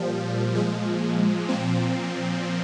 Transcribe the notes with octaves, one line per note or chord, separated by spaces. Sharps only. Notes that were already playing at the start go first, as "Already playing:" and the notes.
Already playing: A#2 F3 G3
A#2 F3 G#3
A#2 F3 C4